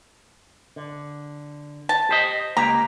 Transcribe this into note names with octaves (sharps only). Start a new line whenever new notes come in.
D3
A5
G4 C5 D#5
C#2 A#3 G4 A#5